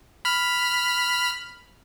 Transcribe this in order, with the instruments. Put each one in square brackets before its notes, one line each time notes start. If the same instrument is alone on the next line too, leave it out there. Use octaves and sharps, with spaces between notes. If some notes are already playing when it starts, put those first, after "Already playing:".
[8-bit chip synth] B5 F6